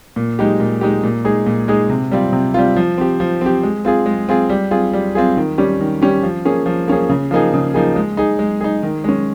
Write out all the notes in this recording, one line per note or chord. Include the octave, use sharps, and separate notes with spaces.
A#2
G#3 D#4 G4
A#2
G#3 D#4 G4
A#2
G#3 D#4 G#4
A#2
G#3 D#4 G#4
C3
G3 C4 F4
C3
G3 C4 F4
F3
C4 G4
F3
C4 G4
G#3
C4 F4 G#4
G#3
C4 F4 G#4
G3
C4 F4 G#4
G3
C4 F4 G#4
D#3
G3 C#4 G4
D#3
G3 C#4 G4
F3
A#3 C#4 G#4
F3
A#3 C#4 G#4
C#3
F3 A#3 D#4 G#4
C#3
F3 A#3 D#4 G#4
G#3
D#4 G#4
G#3
D#4 G#4
D#3
G#3 C#4